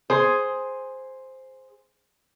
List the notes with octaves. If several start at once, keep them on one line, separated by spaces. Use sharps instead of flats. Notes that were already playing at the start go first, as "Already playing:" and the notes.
G#4 C5